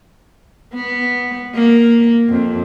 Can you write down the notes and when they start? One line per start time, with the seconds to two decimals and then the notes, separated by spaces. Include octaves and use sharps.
0.74 B3
1.55 A#3
2.29 F2